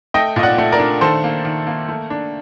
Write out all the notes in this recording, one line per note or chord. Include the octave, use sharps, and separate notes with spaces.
A3 D#5 G5
A#2 D#5
D5 F#5
A3
A#4 D5
D4
D#3 A4 C5
A#3
D#3
A#3
A3
D4